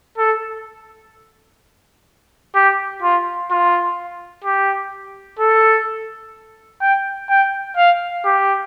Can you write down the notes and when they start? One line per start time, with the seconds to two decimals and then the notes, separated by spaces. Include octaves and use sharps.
0.18 A4
2.55 G4
3.02 F4
3.50 F4
4.44 G4
5.39 A4
6.81 G5
7.29 G5
7.77 F5
8.25 G4